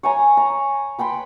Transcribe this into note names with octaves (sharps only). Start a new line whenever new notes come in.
C#5 G#5 A#5
A#5
B4 G5 B5 C6